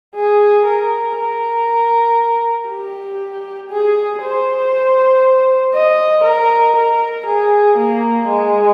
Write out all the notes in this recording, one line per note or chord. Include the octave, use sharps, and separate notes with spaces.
G#4
A#4
A#4
G4
G#4
C5
D#5
A#4
A#4
G#4
A#3
G#3